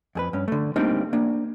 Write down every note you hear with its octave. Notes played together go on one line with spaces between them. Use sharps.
F2 G#4 B4
G2 C#4
D3 A3
G3 A3 A#3 C4 D4 D#4
A#3 D4